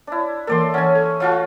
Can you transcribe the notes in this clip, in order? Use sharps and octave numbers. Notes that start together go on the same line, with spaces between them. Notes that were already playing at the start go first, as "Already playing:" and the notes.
D4 E4
E3 A#3 A4 A#4 D5 C6
E3 C#4 F#5 G#5
A4
A3 F4 F#4 C#5 F#5 A5